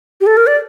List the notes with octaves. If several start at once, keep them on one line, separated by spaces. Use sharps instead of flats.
G4
A4
A#4
D5